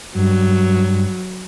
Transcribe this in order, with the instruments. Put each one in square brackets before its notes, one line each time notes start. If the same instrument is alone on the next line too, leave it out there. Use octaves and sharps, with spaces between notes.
[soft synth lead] G2 [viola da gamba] F#3